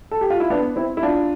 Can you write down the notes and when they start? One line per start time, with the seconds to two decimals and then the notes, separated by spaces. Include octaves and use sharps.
0.11 A4
0.21 G4
0.30 F4
0.40 E4
0.50 B3 D4
0.76 C4 E4
0.97 E4
1.03 D4 F4